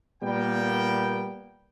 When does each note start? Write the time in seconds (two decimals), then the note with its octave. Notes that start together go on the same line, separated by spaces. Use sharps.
0.23 A#2 G3 A#3 B3 G5